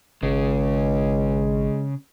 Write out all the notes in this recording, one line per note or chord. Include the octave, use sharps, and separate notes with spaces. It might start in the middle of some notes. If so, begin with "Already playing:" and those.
G#1 C#2 C#3 G#3